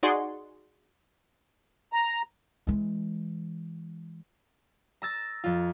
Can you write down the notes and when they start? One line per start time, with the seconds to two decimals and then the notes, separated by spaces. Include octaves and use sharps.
0.03 D#4 F#4 G#4 D5 F#5 C6
1.93 A#5
2.67 E3 G#3
5.02 A#5 E6 A6
5.44 F2 F4